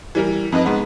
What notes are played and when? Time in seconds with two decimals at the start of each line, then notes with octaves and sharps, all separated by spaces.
0.15 E3 G3 A#4
0.52 F2 D#4 B4 D#5
0.65 G#2 B3